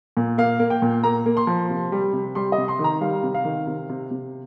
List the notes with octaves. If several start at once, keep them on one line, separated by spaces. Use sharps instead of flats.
A#2
A#3 F5
A#3
G5
A#2
A#3 A#5
A#3
C6
F3
C3
G3
C3
G3 C6
D#5
C3
C6
D#3
A#5
G3 F5
C3
F5
D#3
C3
C3
C3